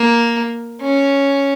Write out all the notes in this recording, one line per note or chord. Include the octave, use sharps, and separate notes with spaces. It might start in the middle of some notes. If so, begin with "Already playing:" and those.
Already playing: A#3
C#4